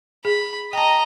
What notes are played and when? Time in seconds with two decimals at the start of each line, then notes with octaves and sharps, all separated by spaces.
0.25 G#4 B5
0.73 D#5 G5 A5 A#5